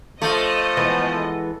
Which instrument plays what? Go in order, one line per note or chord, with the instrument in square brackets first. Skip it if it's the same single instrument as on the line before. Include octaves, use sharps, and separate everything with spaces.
[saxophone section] F3 [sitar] A3 [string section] D#5
[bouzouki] E3 G#3 B3